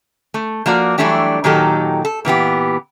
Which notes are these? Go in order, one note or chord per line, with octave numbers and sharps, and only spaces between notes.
A3
F3 A#3 F#4 D5
E3 F#3 G3 A3 D4 G4
A#2 D#3 F#3 D#4 G4 A4
A4
A#2 E3 B3 G4